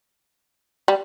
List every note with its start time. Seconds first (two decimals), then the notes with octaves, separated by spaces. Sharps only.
0.88 G3